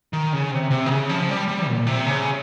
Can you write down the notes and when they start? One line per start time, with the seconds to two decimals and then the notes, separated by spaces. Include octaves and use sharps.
0.13 D#3
0.33 C#3
0.51 C3
0.71 C3
0.86 D#3
0.90 C#3
1.09 F3
1.29 G3
1.48 G3
1.68 A#2
1.87 C3
2.06 C#3